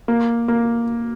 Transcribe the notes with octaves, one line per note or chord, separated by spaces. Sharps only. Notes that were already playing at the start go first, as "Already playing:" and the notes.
A#3
A#3